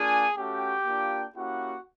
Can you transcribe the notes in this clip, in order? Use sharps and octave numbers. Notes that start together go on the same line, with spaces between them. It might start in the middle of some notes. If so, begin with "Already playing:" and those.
Already playing: A#3 D4 F4 G#4 G#5
A3 C#4 F#4 G4 G5
A#3 D4 F4
A#3 C#4 E4 F#4 G4 F#5